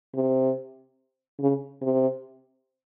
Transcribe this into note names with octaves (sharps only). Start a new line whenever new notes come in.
C3
C#3
C3